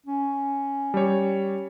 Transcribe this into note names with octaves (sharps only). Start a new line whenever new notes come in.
C#4
G3 C#5